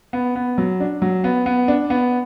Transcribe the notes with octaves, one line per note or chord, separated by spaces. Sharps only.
B3
B3
F#3
D4
F#3
B3
B3
D4
B3